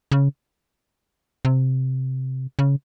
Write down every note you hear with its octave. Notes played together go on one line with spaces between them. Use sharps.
C#3
C3
C#3